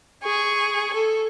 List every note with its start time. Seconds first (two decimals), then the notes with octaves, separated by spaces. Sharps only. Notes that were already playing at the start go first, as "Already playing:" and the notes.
0.24 G#4 C#6
0.94 A4